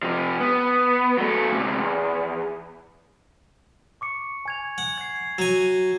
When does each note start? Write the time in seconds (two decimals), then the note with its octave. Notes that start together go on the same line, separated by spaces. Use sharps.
0.03 C3 F3
0.40 B3
1.18 F#3 A3
1.50 D2 C3
1.79 E2
4.01 C#6 D6 C#7
4.46 G#5 G#6 F7
4.78 F#5
4.98 G#6 C7
5.38 F#3 G#5